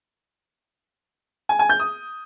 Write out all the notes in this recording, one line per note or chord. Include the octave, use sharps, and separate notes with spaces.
G#5
G#5
G6
D#6